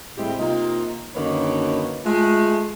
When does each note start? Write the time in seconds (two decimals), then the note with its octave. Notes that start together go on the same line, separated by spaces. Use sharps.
0.17 A2 G3 G#3 C4 E4 G4
0.38 C3 A#3 D#4 F4
1.15 F#2 D3 D#3 A#3 B4 C#5
2.05 G#3 A3 F4